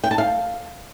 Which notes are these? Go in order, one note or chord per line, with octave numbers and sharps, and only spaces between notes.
G5
A5
F5